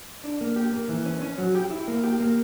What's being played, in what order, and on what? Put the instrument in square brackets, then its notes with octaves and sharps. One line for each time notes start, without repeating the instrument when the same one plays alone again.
[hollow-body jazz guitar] D4
A#3
G4
A#3
E3
C#4
C#4
F#3
G4
E4
A#3
G4
A#3